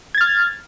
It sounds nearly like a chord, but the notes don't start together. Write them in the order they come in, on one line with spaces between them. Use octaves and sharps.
G#6 A6 F6